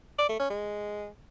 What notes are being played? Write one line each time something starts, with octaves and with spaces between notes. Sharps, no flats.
D5
A3
C#4
G#3